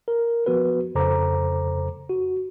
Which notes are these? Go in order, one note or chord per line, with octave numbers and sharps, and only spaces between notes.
A#4
F3 B3 F#4 B4
F2 C#3 A4 C5 A#5 D6
F#4